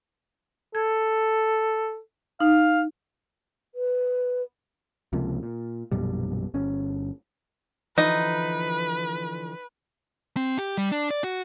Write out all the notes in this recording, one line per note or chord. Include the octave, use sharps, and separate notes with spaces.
A4 G#6
D#4 F5
B4
C#2 C3 F3 A#3
A#2
A#1 F#2 B2 G3
G1 C#4
D3 E3 F3 D#4 B4
C4
G4
G3
D4
D5
F#4